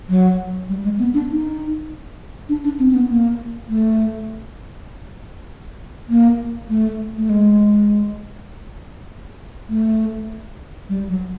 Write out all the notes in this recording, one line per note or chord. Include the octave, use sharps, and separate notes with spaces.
F#3
G3
G#3
B3
D4
D#4
D4
D4
C4
C4
B3
A#3
A3
A#3
A3
A3
G#3
A3
G3
F#3